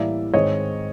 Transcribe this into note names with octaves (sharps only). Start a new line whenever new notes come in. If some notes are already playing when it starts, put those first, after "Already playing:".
Already playing: A2 E3 G3 A#3 D5 E5
G#2 D#3 G#3 C4 C#5 D#5